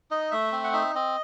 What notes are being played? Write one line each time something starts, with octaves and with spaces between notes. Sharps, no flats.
D#4 D#5
A3 E5
C4
F#5
D#4 E5
C4 D#5